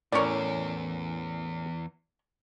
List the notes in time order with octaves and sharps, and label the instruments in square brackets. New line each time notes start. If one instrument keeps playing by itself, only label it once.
[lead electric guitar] E2 [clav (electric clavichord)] A2 C#4 A#4 [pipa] C#5 D5